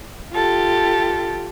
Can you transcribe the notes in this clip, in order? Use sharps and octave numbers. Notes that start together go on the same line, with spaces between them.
F4 G4 A4